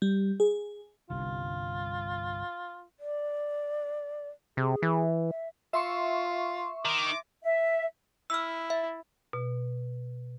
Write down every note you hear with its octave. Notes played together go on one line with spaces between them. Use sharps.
G3
G#4
G1 C2 G2 F4
D5
C3 G#4
E3
E5
F4 E5 C6 C#6
D#3 D6
E5
E4 E6 F6
E5
B2